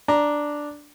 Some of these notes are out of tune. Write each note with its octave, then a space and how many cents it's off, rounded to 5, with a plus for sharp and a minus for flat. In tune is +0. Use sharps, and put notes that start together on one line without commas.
D4 +0 A#5 +0